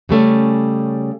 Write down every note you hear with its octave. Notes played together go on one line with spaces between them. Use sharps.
C#3 G3 A3 C#4